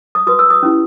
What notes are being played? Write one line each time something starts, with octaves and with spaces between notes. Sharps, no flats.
D#6
F#4 B4 D#6
E6
D#6
C#4 E4 G4